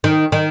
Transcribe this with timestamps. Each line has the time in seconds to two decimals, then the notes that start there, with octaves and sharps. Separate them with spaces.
0.04 D#3
0.32 D#3